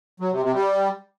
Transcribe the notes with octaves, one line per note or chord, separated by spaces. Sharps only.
F#3
C3
C3
G3